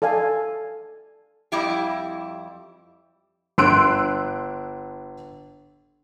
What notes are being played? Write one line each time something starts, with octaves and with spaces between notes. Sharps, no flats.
A4 D5 F5 G#5
F2 G3 E4 G4
G1 C6 E6 F#6 D7